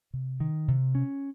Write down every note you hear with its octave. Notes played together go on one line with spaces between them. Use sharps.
C3
D#3
C3
C#4